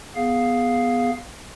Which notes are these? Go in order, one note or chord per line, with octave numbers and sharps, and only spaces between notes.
B3 G#4 F5